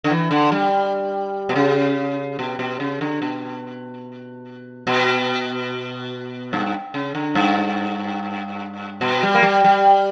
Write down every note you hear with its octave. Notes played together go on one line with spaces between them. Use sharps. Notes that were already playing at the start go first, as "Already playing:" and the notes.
D3
E3
D3
G3
B2
C#3
B2
B2
C#3
D3
B2
B2
G2
C#3
D3
G2
B2
G3
A#3
G3
G3